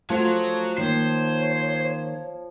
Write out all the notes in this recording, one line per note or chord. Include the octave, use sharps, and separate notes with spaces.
F3 F#3 A3
D#3 A#3 C5 C#5